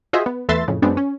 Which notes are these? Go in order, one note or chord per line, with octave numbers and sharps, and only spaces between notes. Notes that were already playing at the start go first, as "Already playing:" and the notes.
F4 F#4 G#4 C5 D#5 E5
B3
E2 A3 B4 E5 C6 A6
F2 A2 C#3
F#2 G#3 B3 C4 D4
C#4